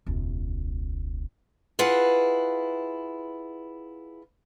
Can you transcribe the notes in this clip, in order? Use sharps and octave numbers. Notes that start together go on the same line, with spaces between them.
E1 C#2
E4 F4 G#4 B4 F#5